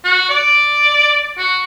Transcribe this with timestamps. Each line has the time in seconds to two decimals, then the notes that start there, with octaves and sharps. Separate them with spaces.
0.05 F#4
0.30 D5
1.38 F#4